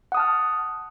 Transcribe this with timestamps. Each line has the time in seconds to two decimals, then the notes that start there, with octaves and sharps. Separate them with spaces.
0.12 F#5
0.15 D#6
0.17 A5
0.20 F6